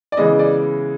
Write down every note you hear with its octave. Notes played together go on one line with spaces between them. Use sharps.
D5
C#3 E3 G#3 B3 D#5
D5